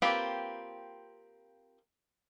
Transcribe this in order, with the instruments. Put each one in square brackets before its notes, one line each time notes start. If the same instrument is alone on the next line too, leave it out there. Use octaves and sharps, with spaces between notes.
[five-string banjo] A#3 C4 F4 G4 B4